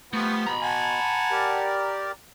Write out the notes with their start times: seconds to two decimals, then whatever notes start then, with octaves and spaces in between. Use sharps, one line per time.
0.13 F3 G3 A3 B3 F#5 C#6
0.47 B2 A#5 B5
0.62 F#5 G#5 A5
1.31 G4 A#4 D5